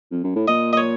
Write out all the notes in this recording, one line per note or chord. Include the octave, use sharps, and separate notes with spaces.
F2
F#2
A2
A#2 D#5
D#5
C#5